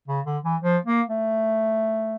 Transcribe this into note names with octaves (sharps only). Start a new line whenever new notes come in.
C#3
D3
E3
F3
A#3
A3